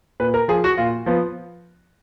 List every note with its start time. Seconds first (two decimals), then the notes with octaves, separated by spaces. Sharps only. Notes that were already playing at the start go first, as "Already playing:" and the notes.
0.20 A#2 B4
0.34 A#4
0.48 F3 G#4
0.64 F#4
0.77 A#2 F4
1.06 F3 B3